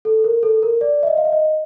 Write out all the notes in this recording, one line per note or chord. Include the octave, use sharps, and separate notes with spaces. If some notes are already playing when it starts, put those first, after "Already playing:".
A4
A#4
A4
A#4
D5
E5
D#5
F5
E5
D#5